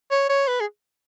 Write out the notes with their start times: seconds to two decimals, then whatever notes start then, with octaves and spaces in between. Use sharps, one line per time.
0.11 C#5
0.29 C#5
0.47 B4
0.61 G#4